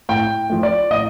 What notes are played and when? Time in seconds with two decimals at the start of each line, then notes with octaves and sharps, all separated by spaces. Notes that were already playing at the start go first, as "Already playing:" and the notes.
0.09 A2 G5
0.50 F3 A3
0.63 D5
0.91 A2 D#5